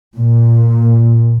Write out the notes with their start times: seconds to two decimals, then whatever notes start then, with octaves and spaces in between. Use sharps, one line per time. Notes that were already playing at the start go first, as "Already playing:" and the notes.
0.17 A#2